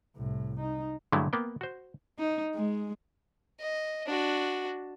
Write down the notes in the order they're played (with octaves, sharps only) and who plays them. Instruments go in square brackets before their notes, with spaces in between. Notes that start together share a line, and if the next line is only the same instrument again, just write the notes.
[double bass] C2 A2
D#4
[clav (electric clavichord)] G2 D3 F#3 G#3 A3 E4
A#3 B3 G5
F#4 C5
[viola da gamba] D#4
G#3
[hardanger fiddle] D#5
D4 F#4